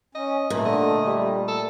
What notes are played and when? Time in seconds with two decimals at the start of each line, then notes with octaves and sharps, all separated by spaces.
0.15 C#4 D#5
0.50 A#2 A3
0.65 D3 D#5
1.07 G3
1.48 A4